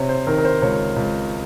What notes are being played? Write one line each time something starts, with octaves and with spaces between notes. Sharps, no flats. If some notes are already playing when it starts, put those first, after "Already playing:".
Already playing: C3 C#5
C5
D#3 A#4
A#4
C5
C#2 C#5
C#2